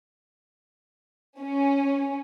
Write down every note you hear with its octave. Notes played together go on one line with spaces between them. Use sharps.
C#4